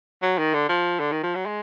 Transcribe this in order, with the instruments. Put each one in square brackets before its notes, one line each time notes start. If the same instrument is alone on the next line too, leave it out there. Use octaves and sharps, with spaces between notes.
[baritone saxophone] F#3
D#3
D3
F3
D3
D#3
F3
F#3
G#3